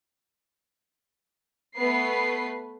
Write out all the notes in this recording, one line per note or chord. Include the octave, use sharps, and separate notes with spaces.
A3 B3 B4 C7